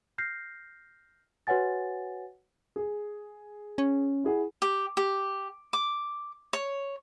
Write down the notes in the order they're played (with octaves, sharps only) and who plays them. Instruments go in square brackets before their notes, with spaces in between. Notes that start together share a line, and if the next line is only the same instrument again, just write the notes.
[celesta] F6 G6 A#6 C7
F#4 B4 C#5 F#5 G#5 A6
[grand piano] G#4
[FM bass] C#4
[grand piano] E4 G#4 F#5
[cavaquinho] G4
G4
D6
C#5